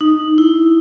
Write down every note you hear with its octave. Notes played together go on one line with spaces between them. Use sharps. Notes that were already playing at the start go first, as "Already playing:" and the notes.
D#4
E4